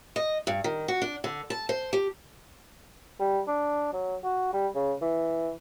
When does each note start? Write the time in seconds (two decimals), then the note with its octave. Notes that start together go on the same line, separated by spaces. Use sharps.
0.16 D#5
0.47 G2
0.64 D#3
0.88 F#4
1.02 D4
1.24 D3
1.50 A5
1.69 C5
1.93 G4
3.20 G3
3.48 D4
3.93 F#3
4.24 F#4
4.53 G3
4.75 C#3
5.01 E3